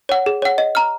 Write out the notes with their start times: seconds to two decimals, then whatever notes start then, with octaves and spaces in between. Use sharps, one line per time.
0.09 C#5 F#5
0.26 G#4
0.42 C#5 F#5
0.58 D#5
0.75 A#5 F6